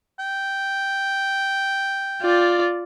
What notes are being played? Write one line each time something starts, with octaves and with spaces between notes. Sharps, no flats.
G5
F4 D5